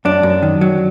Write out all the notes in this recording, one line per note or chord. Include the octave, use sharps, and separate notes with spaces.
F#2 D4
F#2
D#3
F#3